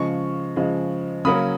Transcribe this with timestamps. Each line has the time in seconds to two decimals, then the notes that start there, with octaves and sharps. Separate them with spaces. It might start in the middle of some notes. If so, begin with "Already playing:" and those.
Already playing: C#3 F3 G#3 C#6
0.56 C#3 F3 G#3
1.25 C#3 F#3 A#3 C#4 B5 D#6